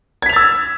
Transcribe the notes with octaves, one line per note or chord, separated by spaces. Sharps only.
E6 G#6 A6 B6 F7